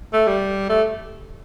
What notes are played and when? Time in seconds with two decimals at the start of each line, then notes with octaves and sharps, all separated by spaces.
0.13 A3
0.27 G3
0.69 A3